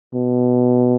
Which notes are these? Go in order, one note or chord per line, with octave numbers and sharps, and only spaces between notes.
B2